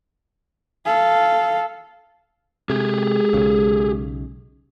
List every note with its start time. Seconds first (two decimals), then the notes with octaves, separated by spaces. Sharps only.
0.85 A4 F5
2.70 C3 G#3 G4 G#4
3.33 B1 C#3